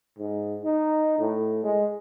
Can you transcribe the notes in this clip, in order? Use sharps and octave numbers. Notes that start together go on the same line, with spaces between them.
G#2
D#4
A2
G#3